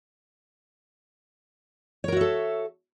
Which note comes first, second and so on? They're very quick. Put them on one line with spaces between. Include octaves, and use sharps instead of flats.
C#5 A#4 F#4 E5 A4